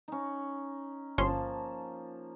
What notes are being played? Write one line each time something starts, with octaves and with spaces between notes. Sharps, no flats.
C#4 D#4
G1 F3 A#3 C#4 A5 C6